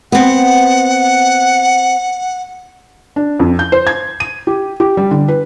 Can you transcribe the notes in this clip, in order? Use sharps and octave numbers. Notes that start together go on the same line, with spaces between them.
B3 C4 F#5
D4
F2
G6
C5
G#6
D#7
G4
G4
G3
D3
B4